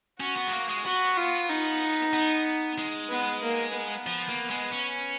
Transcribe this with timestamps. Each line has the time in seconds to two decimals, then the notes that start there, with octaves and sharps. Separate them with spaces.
0.20 C#4 F#4
0.36 B3
0.47 G#3
0.53 A#3
0.69 G#3
0.85 B3 F#4
1.17 F4
1.50 D#4
2.13 B3
2.78 G#3
3.10 B3
3.43 A#3
3.75 B3
4.06 F3
4.28 A#3
4.50 G#3
4.71 C#4